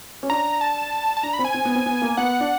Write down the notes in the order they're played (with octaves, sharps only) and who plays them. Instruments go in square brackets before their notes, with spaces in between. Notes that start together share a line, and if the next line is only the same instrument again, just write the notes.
[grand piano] C#4
[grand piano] D4 [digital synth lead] A#5
[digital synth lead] A5
A5
[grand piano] D4 [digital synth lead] A#5
[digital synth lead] B5
[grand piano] C4
[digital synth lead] G#5
[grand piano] C4
B3
C4
B3
A#3
[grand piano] B3 [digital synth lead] F#5
[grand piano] D4